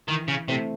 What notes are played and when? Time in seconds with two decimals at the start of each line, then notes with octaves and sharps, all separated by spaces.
0.08 D#3 E3
0.28 C#3
0.48 C3 A3 C4 E4